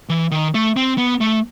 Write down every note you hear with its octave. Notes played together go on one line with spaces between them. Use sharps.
E3
D#3
A3
C4
B3
A3